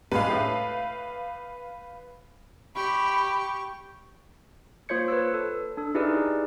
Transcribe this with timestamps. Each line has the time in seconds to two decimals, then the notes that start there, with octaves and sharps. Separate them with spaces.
0.12 G3 G#3 B4 F5
0.30 A2
2.76 G4 B5 C#6
4.89 A#3 F4 C5 C#5 G#6 C#7
5.08 B4 C#5 E6
5.34 A4
5.77 D4 A4
5.94 D#4 E4 G4 G#4 B4 D5